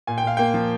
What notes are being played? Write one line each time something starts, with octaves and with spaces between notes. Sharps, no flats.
A#2 G#5
G5
A#2 F5
A#3 G5
F3